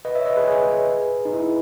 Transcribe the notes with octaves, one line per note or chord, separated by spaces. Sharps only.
B4 D#5
C#5 E5
B4 D#5
G#4 B4
C#5
G#4 B4
D#4
E4